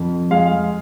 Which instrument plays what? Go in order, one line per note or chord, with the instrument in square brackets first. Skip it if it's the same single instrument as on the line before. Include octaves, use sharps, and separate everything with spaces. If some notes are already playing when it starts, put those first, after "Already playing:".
Already playing: [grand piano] F2
G#3 F5